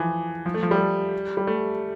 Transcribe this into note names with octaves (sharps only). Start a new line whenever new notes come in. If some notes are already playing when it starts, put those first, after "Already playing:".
Already playing: E3 F3
F3
A3
F3
G3
G3
A3